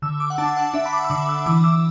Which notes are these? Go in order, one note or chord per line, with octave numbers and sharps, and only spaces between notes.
D3 E6
D6
F#5
D4 A5
F#5
D4 E5
B5
D6
E6
D3 D6
E6
E3 D6
E6